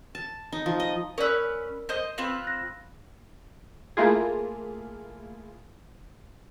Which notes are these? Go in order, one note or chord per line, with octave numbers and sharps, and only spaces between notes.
A5
D#4
F3
D#5
C#4 A#4 B4 D5 E6
C5 D#5
C4 F4 B4
F#6 A#6
A3 A#3 E4 F4 G#4